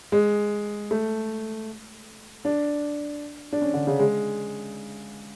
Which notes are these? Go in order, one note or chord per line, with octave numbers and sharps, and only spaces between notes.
G#3
A3
D4
D4
C#4
D3
C#3
G#3